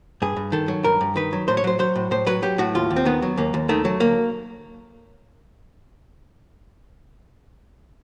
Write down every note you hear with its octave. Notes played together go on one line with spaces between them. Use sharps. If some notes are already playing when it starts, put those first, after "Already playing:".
G2 G#4
G2
D#3 A4
F#3
G2 A#4
G2
D#3 B4
F#3
A2 C5
C#5
F#3 C5
F#3 C5
A2
A2 C5
F#3 B4
F#3 G4
A2 F#4
D#2 F4
D#2
C4
D#3 B3
F#3
D#2 A#3
D#2
D#3 A3
F#3
D2 A#3